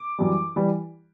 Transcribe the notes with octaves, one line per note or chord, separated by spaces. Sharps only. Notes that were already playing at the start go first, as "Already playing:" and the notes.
Already playing: D6
F#2 E3 G3
E3 G3